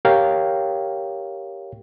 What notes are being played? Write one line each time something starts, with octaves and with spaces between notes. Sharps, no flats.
G4 A#4 C#5 F5 G5